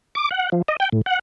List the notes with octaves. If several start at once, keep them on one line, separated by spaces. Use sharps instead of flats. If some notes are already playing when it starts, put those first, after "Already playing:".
D6
F#5
F3
D#5
G5
A2
F#5